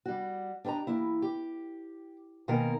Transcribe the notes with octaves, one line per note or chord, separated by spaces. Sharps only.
G3 F#4
D4 G4 B4 D#5 A#5
E3 A#3 E4
G4
B2 D#3 A#3 D#4 A#4 G#5